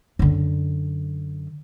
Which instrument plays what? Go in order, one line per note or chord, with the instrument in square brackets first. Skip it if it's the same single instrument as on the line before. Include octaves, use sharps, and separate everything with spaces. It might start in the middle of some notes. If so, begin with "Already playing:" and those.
[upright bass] F#2 D3